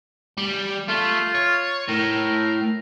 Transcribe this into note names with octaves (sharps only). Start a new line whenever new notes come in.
G3
A3 F4
C#5
A2 A#4